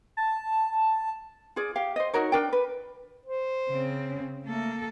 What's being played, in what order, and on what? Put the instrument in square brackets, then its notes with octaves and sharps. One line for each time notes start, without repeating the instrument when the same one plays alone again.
[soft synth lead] A5
[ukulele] F4 G#4 D5
G4 F5
C5 D#5
D#4 F#4 A#4 C#5
D4 A#4 D5 G5
B4
[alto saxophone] C5
[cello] C#3 C4
[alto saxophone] C#4
[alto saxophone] A3 [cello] A#3 A4